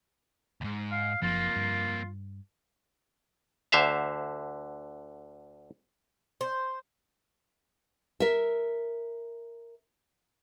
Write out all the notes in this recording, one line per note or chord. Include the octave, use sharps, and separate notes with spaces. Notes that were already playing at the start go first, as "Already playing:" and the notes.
D2 G#2
F5
F#1 F2 F3 A#3 F4
G2
D2 D3 C5 E5 F5
C5
A#4 E5